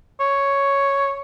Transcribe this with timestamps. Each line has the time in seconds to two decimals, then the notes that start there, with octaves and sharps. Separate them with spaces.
0.20 C#5